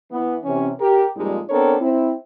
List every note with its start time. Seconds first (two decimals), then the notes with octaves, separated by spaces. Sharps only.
0.12 E3 B3
0.44 C3 E3 C#4
0.80 G4 A#4
1.16 F2 A#2 G3 G#3 D#4
1.50 B3 C4 D4 A4 A#4 C#5
1.80 C4 E4